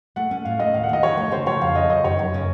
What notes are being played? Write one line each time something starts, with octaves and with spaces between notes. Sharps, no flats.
A3 F#5
C#4
A2 F5
A3 D#5
D#2 F5
F#5
D#3 D#5
F3 C#5
A3
C#3 C5
F3 C#5
F2 F5
C#3 D#5
F#2 D#5
D#3 C#5
F#2
C#3